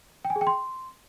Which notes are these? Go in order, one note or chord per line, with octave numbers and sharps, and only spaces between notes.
G5
G#5
G#4
G5
C6